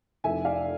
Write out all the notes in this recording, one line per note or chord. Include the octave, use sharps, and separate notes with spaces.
F1 F2 E3 E5 G#5
D5 F5